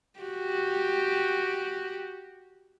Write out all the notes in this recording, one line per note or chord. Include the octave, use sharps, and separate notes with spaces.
F#4 G4